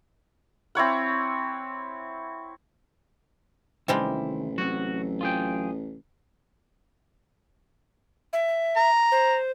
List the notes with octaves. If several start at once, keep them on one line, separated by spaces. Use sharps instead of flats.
C4 E4 C#5 F#5
A1 C3 D#3 G3 G#3 E4
F#3 C4 F#4
F4 G#4 G5
E5
A#5
C5